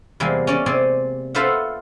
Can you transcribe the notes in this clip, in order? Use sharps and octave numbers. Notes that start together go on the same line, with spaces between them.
E2 C3 G3 G#3 A#3
C#4 D5 D#5
C3 C4 D5 G#5
F4 A4 B4 C5 E5 F#5